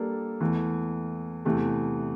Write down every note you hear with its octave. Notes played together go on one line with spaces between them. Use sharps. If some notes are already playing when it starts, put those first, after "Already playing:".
Already playing: G3 A#3 D4 A4
E2 E3 A3
E2 C3 E3 A3